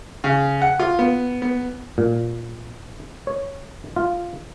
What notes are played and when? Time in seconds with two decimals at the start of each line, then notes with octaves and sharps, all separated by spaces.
0.24 C#3
0.62 F#5
0.79 F4
0.99 B3
1.42 B3
1.98 A#2
3.27 C#5
3.96 F4